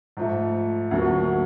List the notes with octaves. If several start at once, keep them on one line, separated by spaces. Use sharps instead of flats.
G#2 F3 A3
D2 D3 F#3 A#3